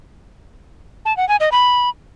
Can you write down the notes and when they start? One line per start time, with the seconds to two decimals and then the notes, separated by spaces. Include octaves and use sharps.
1.05 A5
1.17 F#5
1.29 G#5
1.40 D#5
1.52 B5